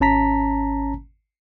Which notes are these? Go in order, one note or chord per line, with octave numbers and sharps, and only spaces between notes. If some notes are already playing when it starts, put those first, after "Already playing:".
G#1 C#4 A5 A#5 B6